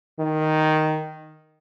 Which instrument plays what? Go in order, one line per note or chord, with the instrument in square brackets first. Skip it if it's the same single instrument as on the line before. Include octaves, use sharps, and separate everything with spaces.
[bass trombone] D#3